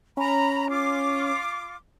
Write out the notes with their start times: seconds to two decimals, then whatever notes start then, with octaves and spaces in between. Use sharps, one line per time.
0.17 C#4 A#5 B5
0.69 F4 D6